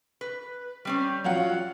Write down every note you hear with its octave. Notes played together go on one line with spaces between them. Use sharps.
B4
G3 C4 C#4
F#3 F4 F#5